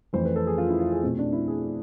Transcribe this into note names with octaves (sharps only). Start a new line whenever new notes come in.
F2 E3 A3 C4 C5
B4
A4
G#4
F4
E4
F4
G#4
B2 A3 C4
C4
D4
E4
G#4